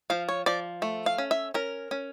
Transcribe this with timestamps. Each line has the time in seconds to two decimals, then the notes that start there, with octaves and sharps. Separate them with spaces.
0.10 F3 F5
0.29 C#5
0.46 F3 D5
0.82 A3
1.06 F5
1.18 C#4
1.31 E5
1.54 C#4 A#4
1.91 C#4